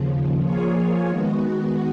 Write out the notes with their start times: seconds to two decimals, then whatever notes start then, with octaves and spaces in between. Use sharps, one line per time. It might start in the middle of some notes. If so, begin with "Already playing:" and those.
Already playing: D#2 C#3 F3
0.39 F3 A#3 F4 G#4 C#5
1.08 D#3 G#3 B3 F#4